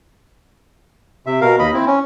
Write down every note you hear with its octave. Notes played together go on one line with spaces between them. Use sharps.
C3 E5
B2 A#4 F5
D#2 D#5 B5
C4 E4
C#4